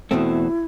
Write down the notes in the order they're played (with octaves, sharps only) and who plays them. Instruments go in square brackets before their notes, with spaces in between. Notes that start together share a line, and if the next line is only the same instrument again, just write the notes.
[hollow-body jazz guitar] E2 B2 A3 C4 [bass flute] E4